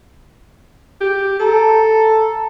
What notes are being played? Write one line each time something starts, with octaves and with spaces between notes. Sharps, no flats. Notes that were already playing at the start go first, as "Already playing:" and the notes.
G4
A4 A5 A#5